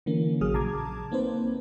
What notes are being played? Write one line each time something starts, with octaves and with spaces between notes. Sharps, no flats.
D3 E3 A#3 C#4
A1 F#3 G#4 D#6 F6
A#1 C#3 A5 A#5 D6 G#6
A#3 C4 D#4 B4 C5